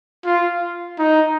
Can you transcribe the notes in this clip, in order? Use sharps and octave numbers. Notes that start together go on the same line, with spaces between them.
F4
D#4